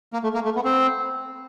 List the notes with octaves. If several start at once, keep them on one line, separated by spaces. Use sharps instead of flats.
A#3
A3
A#3
A3
B3
C4